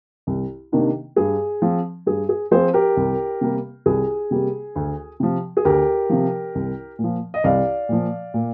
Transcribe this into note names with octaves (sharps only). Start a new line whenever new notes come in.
C2
C3 D#3 A#3 D4
G2 G#4
F3 C4
G2 G#4
G#4
F3 C4 G#4 C5
G4 A#4
C2
C3 G3 A#3
C2 G#4
C3 G3 A#3
D2
C3 F3
G#4
D2 G4 A#4
C3 F3
C2
A#2
F3
D#5
C2 D5 F5
A#2 F3
A#2